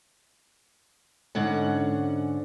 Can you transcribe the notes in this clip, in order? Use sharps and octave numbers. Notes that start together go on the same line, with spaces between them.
G#2 D3 C#4 F#5